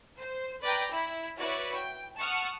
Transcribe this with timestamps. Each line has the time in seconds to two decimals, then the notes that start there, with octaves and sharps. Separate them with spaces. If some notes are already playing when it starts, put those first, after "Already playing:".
0.19 C5
0.62 B4 D5 G5 A#5
0.92 E4
1.38 E4 F#4 B4 C#5 D5
1.75 G5
2.18 F#5 A5 C#6 D#6 F6